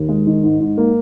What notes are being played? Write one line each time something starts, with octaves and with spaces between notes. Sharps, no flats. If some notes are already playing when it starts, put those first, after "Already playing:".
Already playing: D#2
G#3
D#3
G#2
G#2
A#3